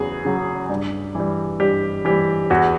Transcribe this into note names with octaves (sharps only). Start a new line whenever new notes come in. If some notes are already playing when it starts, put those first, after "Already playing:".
Already playing: E2 C#3 F#3 G#4
C#3 F#3
G2
E3 G3
G2 G4
E3 G3 G4
E2 F#4